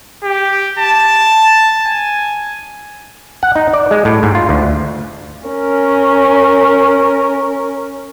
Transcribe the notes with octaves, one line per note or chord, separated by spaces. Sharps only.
G4
A5
G#5
F#5
D#4
D5
G#3
A2
G#2
F4
D2
C#4 A#4